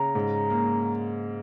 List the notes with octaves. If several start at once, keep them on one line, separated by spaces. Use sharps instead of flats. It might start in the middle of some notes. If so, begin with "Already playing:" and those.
Already playing: C#3 A#5
G#2
A#3